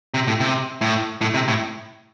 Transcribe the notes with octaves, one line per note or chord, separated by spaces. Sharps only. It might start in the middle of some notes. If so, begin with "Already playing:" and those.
C3
A2
C3
A2
A2
C3
A2